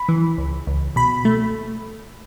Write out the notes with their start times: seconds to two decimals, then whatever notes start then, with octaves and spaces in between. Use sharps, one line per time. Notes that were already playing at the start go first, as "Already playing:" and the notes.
Already playing: B5
0.09 E3
0.38 C#2
0.67 C#2
0.96 B2 B5
1.25 A3